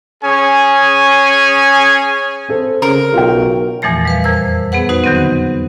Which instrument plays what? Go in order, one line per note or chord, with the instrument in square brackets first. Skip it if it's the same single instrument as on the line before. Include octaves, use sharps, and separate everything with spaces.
[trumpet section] C#4 G#4 G#5
[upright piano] C4 A4 C5
[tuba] C#3 [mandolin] A#4
[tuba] B1 [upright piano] F4 F#4 G5
[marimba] E2 A#2 E3 F3 A3 A#6
G3 B4 F5
F2 A#4 C5 E6
B3 G#4 B4 F#5
D#4 F#4 B4 C5 F#5
D3 D#3 F#3 B3 C4